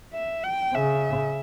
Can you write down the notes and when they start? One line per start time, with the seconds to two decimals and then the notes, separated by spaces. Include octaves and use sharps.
0.13 E5
0.44 G5
0.74 C#3 E5